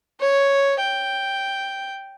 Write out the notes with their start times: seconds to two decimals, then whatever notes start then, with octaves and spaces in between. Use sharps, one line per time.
0.20 C#5
0.80 G5